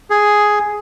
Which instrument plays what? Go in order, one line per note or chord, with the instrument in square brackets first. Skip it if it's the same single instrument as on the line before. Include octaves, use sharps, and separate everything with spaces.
[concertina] G#4